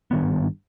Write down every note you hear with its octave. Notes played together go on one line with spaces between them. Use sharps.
G#1 G2 D#3 B3